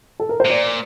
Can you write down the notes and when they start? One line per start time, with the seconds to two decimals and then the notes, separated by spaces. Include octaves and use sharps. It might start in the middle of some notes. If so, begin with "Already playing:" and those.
0.20 A4
0.29 A#4
0.40 C5
0.46 C3
0.50 A#2 D5